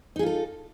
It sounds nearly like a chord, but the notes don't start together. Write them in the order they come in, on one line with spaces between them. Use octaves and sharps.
D#4 G#4 F4 A4